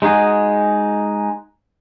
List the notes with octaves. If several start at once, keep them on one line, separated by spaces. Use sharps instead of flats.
G#3 D#4 F#4 G#4